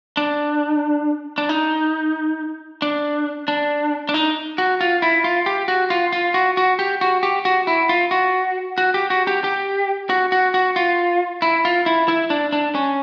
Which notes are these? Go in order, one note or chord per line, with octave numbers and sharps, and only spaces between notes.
D4
D4
D#4
D4
D4
D4
D#4
F#4
F4
E4
F4
G4
F#4
F4
F4
F#4
F#4
G4
F#4
G4
F#4
E4
F4
F#4
F#4
G4
F#4
G4
G4
F#4
F#4
F#4
F4
E4
F4
E4
E4
D4
D4
C#4